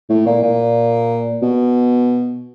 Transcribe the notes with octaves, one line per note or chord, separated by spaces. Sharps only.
A2
A#2
A#2
B2